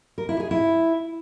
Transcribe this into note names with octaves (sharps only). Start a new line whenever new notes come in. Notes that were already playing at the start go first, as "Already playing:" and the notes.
A#4
E4
G#4
E4